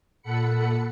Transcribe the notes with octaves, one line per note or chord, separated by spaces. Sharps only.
A#2 A4 F#5 B5 C#7